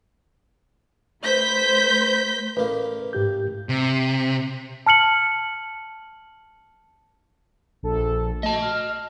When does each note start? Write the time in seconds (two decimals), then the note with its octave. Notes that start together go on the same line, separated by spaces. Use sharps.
1.23 A3 B4 C5 G6 B6
2.57 A1 A#3 B4
3.13 G#2 G4 G6
3.69 C3
4.86 A5 F6 C#7 F#7
7.83 A#1 A4
8.43 A3 D#5 A5
8.62 F6